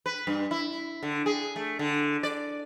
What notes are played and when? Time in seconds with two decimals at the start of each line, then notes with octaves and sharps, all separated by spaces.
0.06 B4
0.27 G2
0.51 E4
1.03 D3
1.26 G#4
1.56 A3
1.79 D3
2.23 D5